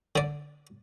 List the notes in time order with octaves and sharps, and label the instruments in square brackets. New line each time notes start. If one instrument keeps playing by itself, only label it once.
[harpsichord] D3 D5